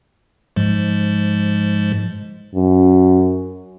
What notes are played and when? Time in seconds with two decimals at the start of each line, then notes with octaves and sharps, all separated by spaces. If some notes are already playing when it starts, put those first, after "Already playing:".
0.56 G#2 F3 G#3
2.55 F#2